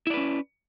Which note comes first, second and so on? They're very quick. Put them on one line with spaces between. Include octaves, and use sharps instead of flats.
E4 D5 B4 C#4